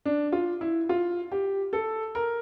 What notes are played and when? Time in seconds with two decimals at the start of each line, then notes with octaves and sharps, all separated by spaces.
0.05 D4
0.32 F4
0.61 E4
0.89 F4
1.32 G4
1.73 A4
2.15 A#4